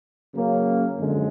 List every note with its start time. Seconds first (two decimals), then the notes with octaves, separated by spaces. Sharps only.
0.34 C#3 F#3 A#3 C#4
0.99 F#2 D3 F3 G#3